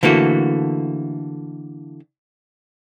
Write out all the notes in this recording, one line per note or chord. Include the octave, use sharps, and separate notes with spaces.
D3 E3 A3 A#3 F#4